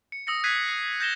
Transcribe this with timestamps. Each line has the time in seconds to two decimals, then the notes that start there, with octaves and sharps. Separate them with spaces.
0.12 C#7
0.27 D#6 E6 A#6 C#7
0.44 F#6 G#6 B6 C7 D#7
0.68 D#6 C7
0.88 B6
1.00 G6 A#6 E7 G7